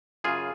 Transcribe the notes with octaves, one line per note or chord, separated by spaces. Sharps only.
F#2 C#3 F4 G#4